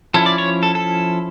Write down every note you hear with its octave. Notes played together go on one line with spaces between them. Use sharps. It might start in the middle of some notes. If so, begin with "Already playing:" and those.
F3 C#4 E4 A4
D5
C#5
A4
A4